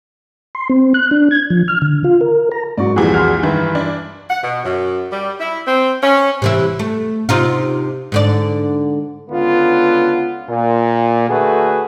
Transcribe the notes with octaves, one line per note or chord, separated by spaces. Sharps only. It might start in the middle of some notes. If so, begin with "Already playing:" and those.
C6
C4
F#6
D4
G#6
F3
F6
D3
F4
A#4
A#5
G#2 F#3 D5 C#6
C2 F2 A#2 E3 G3 F#4 G#4
C6 F6
G2 D#3 E3 B4
D4
F#5
B2
F#2
G3
E4
C4
C#4
C3 E3 E4
A3
C3 D#4 F4
G#2 D3 D5
C#2 D3 B3 F4
A#2
D3 A3 F#4 G#4 B4